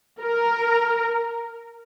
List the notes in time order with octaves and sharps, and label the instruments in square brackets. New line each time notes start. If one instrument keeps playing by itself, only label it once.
[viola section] A#4